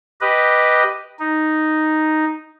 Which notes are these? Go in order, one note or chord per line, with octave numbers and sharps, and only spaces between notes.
G4 B4 D#5
D#4